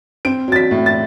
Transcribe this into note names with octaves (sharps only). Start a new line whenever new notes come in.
C4 D7
F#3 A6
B6
A2
A6